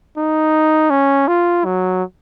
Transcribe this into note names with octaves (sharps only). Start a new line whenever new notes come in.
D#4
C#4
F4
F#3